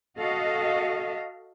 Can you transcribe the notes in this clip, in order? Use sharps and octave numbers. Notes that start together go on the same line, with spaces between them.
F#4 A4 D#5 F5